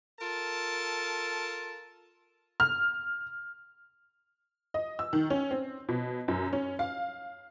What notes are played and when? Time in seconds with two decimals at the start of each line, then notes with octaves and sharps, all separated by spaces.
0.20 F4 A4 A#4 A5
2.60 F6
4.74 D#5
4.99 E6
5.13 D#3
5.30 C#4
5.51 C4
5.89 B2
6.28 F#2
6.53 C#4
6.79 F5